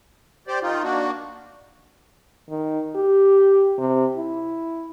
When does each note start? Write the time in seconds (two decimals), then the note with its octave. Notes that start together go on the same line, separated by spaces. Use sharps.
0.48 G4 C5 D5
0.63 D#3 D#4 F4
0.83 A#3 D4 F#4
2.49 D#3
2.95 G4
3.78 C3
4.16 E4